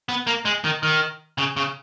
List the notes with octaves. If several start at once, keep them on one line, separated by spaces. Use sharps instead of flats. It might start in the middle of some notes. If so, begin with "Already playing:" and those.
B3
A#3
G#3
D#3
D#3
C#3
C#3